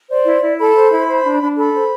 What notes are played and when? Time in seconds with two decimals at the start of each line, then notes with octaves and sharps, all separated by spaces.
0.09 C5 D5
0.26 E4
0.42 E4
0.58 A4 B5
0.75 C5
0.91 E4
1.08 C5
1.24 D4
1.41 D4
1.57 A4 B5
1.73 C5